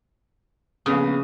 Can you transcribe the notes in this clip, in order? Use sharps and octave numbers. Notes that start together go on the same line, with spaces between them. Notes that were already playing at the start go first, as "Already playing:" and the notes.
A#1 C#3 B3 D#6